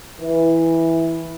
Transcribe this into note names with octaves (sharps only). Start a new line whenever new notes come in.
E3